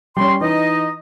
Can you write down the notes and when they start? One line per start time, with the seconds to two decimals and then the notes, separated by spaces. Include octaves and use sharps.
0.17 G3 C#4 C6
0.41 E3 D#4 D#5